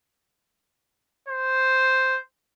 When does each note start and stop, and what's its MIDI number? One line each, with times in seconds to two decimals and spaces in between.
1.28 2.19 72